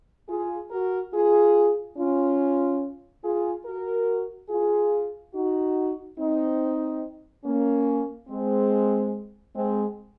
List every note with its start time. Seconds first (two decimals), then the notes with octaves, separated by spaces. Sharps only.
0.29 F4 G#4
0.71 F#4 A#4
1.13 F4 G#4
1.97 C#4 F4
3.23 F4 G#4
3.66 F#4 A#4
4.50 F4 G#4
5.35 D#4 F#4
6.18 C4 D#4
7.45 A#3 C#4
8.29 G#3 C4
9.55 G#3 C4